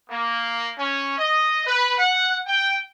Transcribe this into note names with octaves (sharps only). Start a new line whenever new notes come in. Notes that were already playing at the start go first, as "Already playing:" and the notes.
A#3
C#4
D#5
B4
F#5
G5